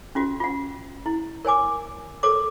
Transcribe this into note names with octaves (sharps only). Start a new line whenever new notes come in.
C#4 F4 F#4
F4 F#5
E4
A#4 C#5 G#5 D6
A4 A#4 C#5 D6